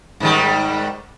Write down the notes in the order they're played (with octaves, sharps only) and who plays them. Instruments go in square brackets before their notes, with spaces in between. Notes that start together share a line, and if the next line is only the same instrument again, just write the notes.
[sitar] G#2 D#3 G3